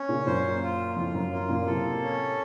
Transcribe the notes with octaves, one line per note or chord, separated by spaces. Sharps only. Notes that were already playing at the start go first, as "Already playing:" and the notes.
Already playing: C#4
A#2 C#3
F#2 A#2 C5
F4
F2 A2 F4
F#2
F#2 A#3
F#2 A#2
A2 C3 A4
C#4